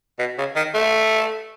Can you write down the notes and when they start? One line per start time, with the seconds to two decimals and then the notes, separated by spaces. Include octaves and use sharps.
0.19 B2
0.38 C#3
0.56 D#3
0.75 A3